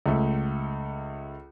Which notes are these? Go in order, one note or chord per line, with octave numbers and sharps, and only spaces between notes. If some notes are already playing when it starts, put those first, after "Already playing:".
C#2 A3